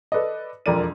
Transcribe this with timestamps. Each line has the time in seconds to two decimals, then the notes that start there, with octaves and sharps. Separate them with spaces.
0.12 A4 B4 D5 D#5
0.66 E1 F2 A#4 D5 D#7